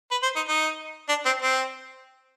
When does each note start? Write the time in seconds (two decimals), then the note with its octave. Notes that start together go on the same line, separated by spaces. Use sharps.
0.11 B4
0.23 C5
0.36 D#4
0.48 D#4
1.09 D4
1.26 C4
1.42 C4